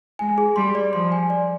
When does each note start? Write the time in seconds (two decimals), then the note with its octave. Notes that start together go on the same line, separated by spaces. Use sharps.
0.19 G#3 G#5
0.38 G#4
0.56 G3 C6
0.75 D5
0.93 F3 C6
1.12 G#5
1.30 D5